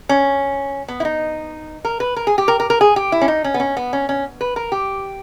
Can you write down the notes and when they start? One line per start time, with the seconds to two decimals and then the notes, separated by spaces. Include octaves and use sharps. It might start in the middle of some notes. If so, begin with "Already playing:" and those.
0.09 C#4
0.88 B3
1.00 E4
1.05 D#4
1.85 A#4
2.00 B4
2.16 A#4
2.27 G#4
2.38 G4
2.48 A#4
2.60 A#4
2.70 A#4
2.81 G#4
2.96 G4
3.12 E4
3.21 C#4
3.28 D#4
3.44 C#4
3.54 B3
3.60 C#4
3.77 B3
3.93 C#4
4.09 C#4
4.41 B4
4.56 A#4
4.72 G4